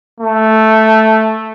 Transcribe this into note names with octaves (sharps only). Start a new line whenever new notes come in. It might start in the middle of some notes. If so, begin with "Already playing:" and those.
A3